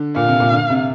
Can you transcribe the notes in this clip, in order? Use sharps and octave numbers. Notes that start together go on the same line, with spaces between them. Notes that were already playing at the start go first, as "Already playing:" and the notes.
Already playing: D3
A#2 F5
C3
A#2
D3
C3